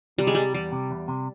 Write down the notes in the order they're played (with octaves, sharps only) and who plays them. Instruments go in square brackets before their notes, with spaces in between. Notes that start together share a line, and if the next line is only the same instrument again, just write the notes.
[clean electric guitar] C3 [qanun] G3
[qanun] G#3
[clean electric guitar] C3 [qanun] G3
[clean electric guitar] E2 [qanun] G3
[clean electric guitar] C3
E2
C3